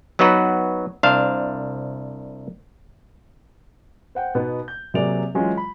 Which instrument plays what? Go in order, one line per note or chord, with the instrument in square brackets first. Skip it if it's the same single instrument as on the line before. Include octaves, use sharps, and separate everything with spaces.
[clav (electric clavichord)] F#3 B3 D#4 F#4 B4
C2 D4 C5 F5 A5
[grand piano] C5 F#5 G5
B2 B3 D#4
G6
C3 F#3 A#3 G#4 D5 F7
E3 F#3 G#3 C#4 F4
B5